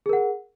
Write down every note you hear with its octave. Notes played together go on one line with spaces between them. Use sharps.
G#4 A#4 F#5